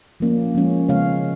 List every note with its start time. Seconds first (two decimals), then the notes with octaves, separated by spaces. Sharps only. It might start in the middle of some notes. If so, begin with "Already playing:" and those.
0.20 F3 A#3 C#4
0.55 F3 G#3 C#4
0.88 C#3 G#3 B3 C#5 F5